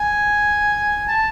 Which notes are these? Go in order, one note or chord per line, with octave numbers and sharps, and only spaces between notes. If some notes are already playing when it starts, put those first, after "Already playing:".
Already playing: G#5
A5